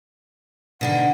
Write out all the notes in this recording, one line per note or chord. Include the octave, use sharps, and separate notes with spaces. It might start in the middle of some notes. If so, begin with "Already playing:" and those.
B2 D3 D#3 F#5